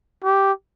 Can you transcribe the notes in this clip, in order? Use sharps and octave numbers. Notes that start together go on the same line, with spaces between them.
G4